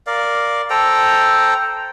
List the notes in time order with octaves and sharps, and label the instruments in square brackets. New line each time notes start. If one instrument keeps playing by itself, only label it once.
[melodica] A#4 D5 F5
A4 C5 G5 A#5